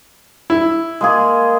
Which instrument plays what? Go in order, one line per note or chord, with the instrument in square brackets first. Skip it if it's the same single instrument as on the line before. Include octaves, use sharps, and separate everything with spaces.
[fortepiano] E4
[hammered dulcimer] G#3 A#3 G#4